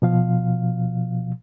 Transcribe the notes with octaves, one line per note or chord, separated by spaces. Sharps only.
B2 F3 F5